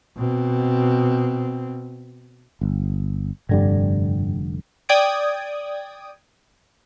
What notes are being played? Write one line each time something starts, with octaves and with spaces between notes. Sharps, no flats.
B2 C4
G1
F1 G2 D3 G3
D5 G5 D#6 G#6 D7